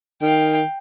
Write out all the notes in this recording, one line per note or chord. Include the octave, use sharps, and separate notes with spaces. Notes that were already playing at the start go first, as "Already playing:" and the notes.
D#3 F5 G5